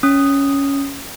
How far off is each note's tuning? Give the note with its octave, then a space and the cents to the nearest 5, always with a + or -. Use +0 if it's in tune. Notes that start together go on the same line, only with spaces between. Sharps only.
C#4 +5 D#6 -5